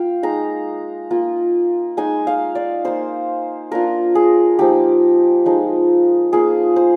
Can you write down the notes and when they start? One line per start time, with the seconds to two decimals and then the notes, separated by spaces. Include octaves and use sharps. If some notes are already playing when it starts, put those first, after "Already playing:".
Already playing: A#3 F4 F5 G5
0.23 G#3 D#4 A#5
1.11 A#3 F4
1.97 G#3 D#4 G#5
2.27 F5
2.55 D5
2.84 A#3 D#4 C5
3.72 A#3 D4 F4 A#4
4.15 G#4
4.59 F3 A#3 D#4 G4
5.46 F3 G#3 D#4
6.33 A#3 F4 G#4
6.76 C5